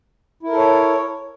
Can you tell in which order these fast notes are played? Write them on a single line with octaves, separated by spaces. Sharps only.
E4 A#4 A4 C#5